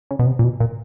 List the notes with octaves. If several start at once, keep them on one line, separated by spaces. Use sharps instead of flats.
C#3
B2
C3
A#2
B2
A#2